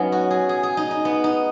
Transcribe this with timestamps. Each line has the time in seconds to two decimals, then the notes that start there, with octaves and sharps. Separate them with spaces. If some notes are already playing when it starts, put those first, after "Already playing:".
Already playing: F#3 B3 C#4 D#4
0.12 F#4
0.30 G#4
0.49 G#4
0.63 G#4
0.77 D#4
0.91 D#4
1.05 B3
1.24 D#4